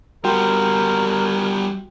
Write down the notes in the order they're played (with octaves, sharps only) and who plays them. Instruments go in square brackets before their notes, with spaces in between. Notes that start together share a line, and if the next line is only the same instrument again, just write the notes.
[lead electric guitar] G3 B3 [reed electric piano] F#4 G5 C6 [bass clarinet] A#4